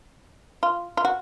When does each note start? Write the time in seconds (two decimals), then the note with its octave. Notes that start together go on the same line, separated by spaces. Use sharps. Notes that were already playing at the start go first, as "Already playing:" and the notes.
0.63 F4
0.97 F4
1.05 F#4